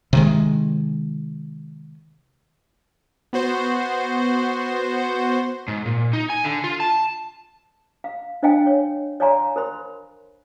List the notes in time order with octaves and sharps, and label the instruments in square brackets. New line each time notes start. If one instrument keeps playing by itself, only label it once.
[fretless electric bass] C3 D#3 G#3
[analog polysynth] B3 F#4 C5
[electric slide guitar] G#2
A#2
D#4
G#5
D3
F4
A5
[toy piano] F5
D4 C5 D#5 F5 G5 G#5
C#5
C#5 D5 F5 G#5 A#5 C6
A#4 C5 B5 C6